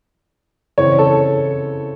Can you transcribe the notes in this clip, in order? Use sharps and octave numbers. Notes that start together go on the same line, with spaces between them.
C#3 E3 C4 C#5
A4